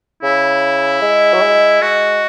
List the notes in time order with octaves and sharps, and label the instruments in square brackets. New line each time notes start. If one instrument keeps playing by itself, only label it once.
[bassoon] C#3 [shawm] E4
[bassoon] G#3
F#3
G#3
[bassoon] G#3 [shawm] F#4